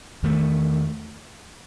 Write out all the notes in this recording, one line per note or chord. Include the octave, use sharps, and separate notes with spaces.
E2 D#3 A3